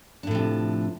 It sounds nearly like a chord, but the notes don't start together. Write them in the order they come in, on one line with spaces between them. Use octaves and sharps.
D4 A2 F3 C3